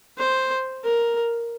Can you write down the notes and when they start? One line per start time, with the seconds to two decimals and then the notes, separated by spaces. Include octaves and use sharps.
0.18 C5
0.84 A#4